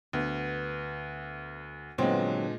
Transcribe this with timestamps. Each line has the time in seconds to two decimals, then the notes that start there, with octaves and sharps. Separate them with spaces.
0.13 D2 B3
1.98 G2 A#2 D3 F#3 G#3 B3 C4